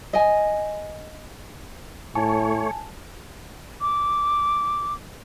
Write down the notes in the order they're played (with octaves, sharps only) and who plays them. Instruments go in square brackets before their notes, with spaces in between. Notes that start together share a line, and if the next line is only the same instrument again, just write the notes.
[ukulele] D#5 G#5
[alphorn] A2 [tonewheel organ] A3 C#5 [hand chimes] G#5 A5
[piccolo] D6